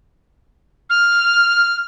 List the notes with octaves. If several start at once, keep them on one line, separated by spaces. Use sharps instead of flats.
F6